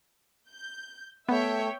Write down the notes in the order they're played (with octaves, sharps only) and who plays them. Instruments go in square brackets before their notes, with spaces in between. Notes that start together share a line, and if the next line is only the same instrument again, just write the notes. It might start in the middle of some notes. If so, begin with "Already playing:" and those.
[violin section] G6
[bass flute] A3 [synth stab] B3 [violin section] C#5 E5 G5